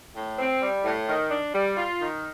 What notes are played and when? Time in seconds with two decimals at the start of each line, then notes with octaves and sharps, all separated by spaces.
0.15 A2
0.38 C4
0.61 G3
0.84 A2
1.07 D#3
1.30 D4
1.54 G3
1.77 F4
2.00 D#3